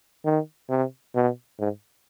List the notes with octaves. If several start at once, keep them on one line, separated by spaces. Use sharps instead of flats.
D#3
C3
B2
G#2